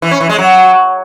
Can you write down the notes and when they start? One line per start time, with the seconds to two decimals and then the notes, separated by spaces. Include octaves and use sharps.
0.02 E3
0.11 C#4
0.20 E3
0.29 G#3
0.38 F#3